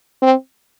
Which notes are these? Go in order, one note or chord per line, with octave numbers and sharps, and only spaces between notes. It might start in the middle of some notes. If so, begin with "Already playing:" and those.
C4